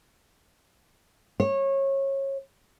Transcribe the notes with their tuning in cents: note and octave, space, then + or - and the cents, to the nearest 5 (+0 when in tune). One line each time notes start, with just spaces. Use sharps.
C#5 -25